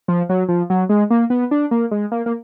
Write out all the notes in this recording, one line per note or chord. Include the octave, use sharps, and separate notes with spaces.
F3
F#3
F3
F#3
G#3
A#3
B3
D4
A#3
G#3
A#3
A#3